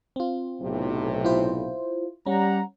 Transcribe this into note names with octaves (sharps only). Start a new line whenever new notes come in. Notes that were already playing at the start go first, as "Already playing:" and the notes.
C4 F4
B1 A2 C3
E4 F4 C5
G3 C#4 F#5 A#5